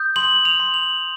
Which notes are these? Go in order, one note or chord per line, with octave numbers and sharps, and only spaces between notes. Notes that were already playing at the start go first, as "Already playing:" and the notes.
Already playing: D#6 G6
C6 F#7
F7
C6
F#7